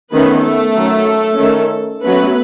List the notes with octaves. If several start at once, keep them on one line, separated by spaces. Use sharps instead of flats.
D#3 A3 B3 C#4 B4
A3 A4
D#3 F#3 C#4
D#3 A3 C#4
F#3 A3 B3 C#4 B4